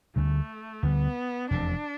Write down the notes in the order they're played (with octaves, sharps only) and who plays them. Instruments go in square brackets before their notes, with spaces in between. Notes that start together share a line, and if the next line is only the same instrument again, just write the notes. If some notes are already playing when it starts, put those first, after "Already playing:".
[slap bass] D2 D3 G3 [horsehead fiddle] A3
[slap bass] D2 D3 G3 [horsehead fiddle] B3
[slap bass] F1 E2 C3 [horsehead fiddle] D4